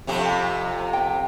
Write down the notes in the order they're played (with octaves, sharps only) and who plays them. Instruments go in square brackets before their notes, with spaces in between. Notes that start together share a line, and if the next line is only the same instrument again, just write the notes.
[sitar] F2 C3 G4
[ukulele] G5